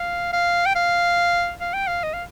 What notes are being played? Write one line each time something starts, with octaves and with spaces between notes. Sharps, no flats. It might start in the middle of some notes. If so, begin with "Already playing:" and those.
Already playing: F5
F5
G5
F5
F5
G5
F5
D#5
F5